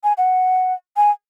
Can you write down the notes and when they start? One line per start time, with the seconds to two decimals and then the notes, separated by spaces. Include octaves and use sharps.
0.04 G#5
0.17 F#5
0.97 G#5